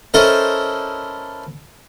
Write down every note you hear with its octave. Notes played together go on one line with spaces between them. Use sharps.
C#4 E4 A4 A#4 C5 D#5